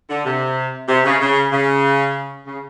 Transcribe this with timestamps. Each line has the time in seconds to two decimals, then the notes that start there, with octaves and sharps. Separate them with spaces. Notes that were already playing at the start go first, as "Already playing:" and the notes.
0.09 D3
0.25 C3
0.89 C3
1.04 C#3
1.21 C#3
1.52 C#3
2.46 C#3